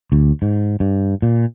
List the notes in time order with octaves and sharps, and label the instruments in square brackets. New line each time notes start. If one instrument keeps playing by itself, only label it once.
[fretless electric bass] D2
G#2
G2
A#2